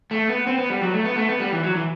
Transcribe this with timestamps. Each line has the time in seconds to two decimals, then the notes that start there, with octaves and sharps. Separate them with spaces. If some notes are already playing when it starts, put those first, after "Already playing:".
0.11 A3
0.29 B3
0.47 C4
0.58 B3
0.70 G3
0.82 F#3
0.93 A3
1.05 B3
1.16 A3
1.29 B3
1.40 G3
1.52 E3
1.63 F#3
1.76 E3